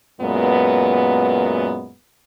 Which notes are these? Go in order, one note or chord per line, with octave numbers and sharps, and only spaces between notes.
F#2 A#2 G#3 B3